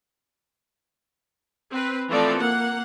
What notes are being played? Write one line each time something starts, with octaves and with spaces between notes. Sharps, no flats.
C4 B4
E3 F3 A3 C4 A4 D5
A#3 F#5